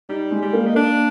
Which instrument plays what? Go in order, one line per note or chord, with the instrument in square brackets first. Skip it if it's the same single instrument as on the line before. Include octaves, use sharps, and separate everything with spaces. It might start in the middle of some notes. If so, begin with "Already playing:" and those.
[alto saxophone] G3 [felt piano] D#4
[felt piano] G#3
[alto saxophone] G3
[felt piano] A#3
[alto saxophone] D#4
[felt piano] A#3 [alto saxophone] D4